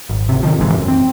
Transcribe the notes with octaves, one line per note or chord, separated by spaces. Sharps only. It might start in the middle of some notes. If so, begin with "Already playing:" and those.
G#1
A1 C3
C3 D#3 F3
F1 B1 G#2 E3
F#2
C4